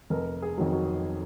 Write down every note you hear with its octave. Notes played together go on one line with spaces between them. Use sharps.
F1 A#4
G#4
F2 D#3 F#3
F#4